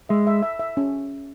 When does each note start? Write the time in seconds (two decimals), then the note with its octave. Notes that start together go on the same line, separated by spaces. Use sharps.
0.09 G#3 E5
0.27 E5
0.43 E5
0.59 E5
0.77 C#4